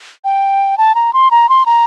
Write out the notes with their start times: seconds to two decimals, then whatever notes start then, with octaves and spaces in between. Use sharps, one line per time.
0.24 G5
0.78 A5
0.95 A#5
1.13 C6
1.31 A#5
1.49 C6
1.66 A#5